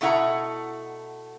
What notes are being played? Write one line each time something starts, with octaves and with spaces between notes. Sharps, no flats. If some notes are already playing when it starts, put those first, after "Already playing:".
B2 A3 E4 F#5 A#5